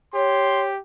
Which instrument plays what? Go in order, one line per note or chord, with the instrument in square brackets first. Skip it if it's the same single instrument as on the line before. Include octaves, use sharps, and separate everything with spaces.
[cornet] G4 [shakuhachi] C#5 [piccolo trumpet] C6